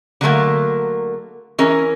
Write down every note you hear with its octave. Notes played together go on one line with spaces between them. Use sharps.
D3 F#3 A3 A#3
E3 C#4 A#4